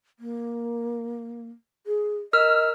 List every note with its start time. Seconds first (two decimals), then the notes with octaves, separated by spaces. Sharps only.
0.19 A#3
1.87 G#4
2.33 A#4 D#5 E6 F6